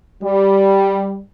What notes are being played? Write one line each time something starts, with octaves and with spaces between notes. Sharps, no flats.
G3